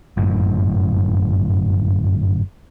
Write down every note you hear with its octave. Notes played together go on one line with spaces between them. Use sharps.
G1 F#2 A2